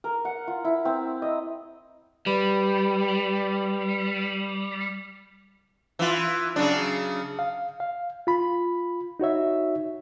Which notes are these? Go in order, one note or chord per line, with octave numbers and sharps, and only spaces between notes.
A#4
F#5
F4
E4
C4
D#5
G3 B4 B5
E3 F4
C#3 F#3 D4
F5
F5
F4 B5
D#4 F#4 C#5 E5